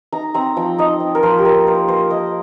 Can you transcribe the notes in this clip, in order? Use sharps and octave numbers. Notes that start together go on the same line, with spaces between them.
D#4 A#5
C4 A#5
F3 G5
D#4 D#5
C4
A#4
F3 C5
G4
A#3 A#4
A#3 C5
F4 C5
A#3 D#5